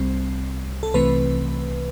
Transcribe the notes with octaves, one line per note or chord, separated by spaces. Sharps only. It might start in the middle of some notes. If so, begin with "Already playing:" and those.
Already playing: C2 C3 G3 C4
A4
C2 C3 E3 A3 C4 B4